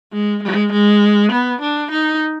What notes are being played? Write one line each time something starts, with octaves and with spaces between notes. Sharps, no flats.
G#3
G#3
G#3
B3
D4
D#4